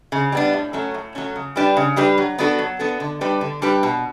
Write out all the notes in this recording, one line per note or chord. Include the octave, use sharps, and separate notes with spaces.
C#3
G3 B3 D4
A2
F#3 A3 C#4
A2
F#3 A3 C#4
C#3
G3 D4 G4 B4
C#3
G3 D4 G4 B4
F#3
B3 D4 F#4 A4
F#3
B3 D4 F#4 A4
D3
G3 D4 G4 B4
D3
G3 D4 G4 B4
B2